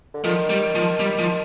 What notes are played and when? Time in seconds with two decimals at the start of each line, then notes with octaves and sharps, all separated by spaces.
0.14 D3
0.24 D#3 F3
0.50 G3
0.75 F3
1.00 G3
1.19 F3